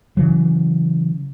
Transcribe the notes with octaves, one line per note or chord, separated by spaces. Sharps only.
C#3 E3 F#3